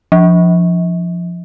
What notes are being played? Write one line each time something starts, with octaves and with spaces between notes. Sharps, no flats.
F3